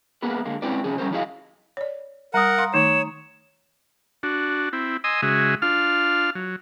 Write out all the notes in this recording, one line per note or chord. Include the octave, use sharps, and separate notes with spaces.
A#3 B3 G#4 A#4 B4
D3 G#3 A#3
G#3 C4 C#4 E4 B4 D5
C3 F3 C#4 G#4
G3 C#4 A#4 C5
F3 F#3 E4 G#4 D#5 F5
C#5 D5
G3 A#4 F#5 A#5 D#6
F5 C6
D#3 A3 D#4 C#5 E7
D4 F#4
C4 E4
D#5 G#5 C6 D#6 E6
C#3 G#3 F#4 G#4 E5
D4 F4 F5 F6
F#3